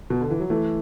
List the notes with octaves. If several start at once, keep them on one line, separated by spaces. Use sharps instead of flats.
B2
D3
E3
F#3
E3 A3